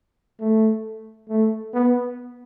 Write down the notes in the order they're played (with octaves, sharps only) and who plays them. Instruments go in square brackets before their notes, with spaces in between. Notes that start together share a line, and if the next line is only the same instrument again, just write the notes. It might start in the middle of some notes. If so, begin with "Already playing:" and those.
[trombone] A3
A3
B3